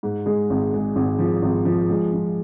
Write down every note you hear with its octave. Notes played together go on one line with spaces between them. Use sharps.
G#2
G#3
G#1
G#3
G#1
F3
G#1
F3
G#3
F3